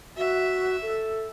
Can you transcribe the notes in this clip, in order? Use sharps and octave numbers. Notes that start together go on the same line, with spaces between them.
F#4 E5
A4